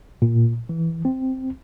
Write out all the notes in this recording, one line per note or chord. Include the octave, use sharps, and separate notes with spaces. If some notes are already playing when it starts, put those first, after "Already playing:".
A#2
E3
C4